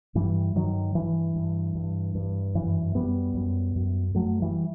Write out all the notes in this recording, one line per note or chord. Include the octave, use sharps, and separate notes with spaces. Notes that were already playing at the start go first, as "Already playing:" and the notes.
G2 E3 G3
G2 D#3 F#3
G2 E3
G2
G2
G2
F#2 E3
F#2 G3 B3
F#2
F#2
F#2 F#3 A3
E3 G3